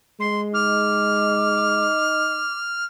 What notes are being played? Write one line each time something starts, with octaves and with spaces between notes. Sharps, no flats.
G#3 C6
D#4 D6 F6